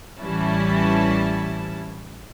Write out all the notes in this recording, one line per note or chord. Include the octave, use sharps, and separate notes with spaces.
A1 E3 G3 C#4 E4 A5